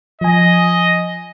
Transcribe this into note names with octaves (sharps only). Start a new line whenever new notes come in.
F3 D#5 G#5